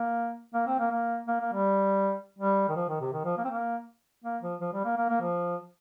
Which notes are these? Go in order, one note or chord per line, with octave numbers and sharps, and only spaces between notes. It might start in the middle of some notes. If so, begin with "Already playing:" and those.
Already playing: A#3
A#3
C4
A#3
A#3
A#3
A#3
G3
G3
D#3
F3
D#3
C3
D#3
F3
A#3
C4
A#3
A#3
F3
F3
G3
A#3
A#3
A#3
F3